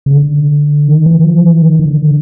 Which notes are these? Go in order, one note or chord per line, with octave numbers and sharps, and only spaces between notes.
C#3
D3
D#3
E3
F3
E3
D#3
D#3
D3